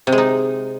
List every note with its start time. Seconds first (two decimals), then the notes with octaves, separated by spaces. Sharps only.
0.07 C3
0.12 G#3
0.18 D#4